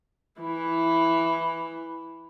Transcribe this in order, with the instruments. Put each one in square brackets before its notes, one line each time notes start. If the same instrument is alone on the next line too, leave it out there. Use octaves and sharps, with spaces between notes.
[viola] E3 E4